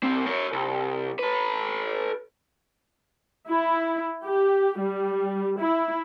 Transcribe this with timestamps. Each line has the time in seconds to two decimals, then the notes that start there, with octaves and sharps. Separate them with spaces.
0.04 C2 C4
0.26 A#4 C#5
0.52 C2
1.19 A4 B4
3.47 E4
4.24 G4
4.80 G3
5.60 E4